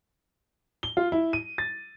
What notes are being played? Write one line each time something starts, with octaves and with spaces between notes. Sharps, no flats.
G7
F4
E4
D#7
A6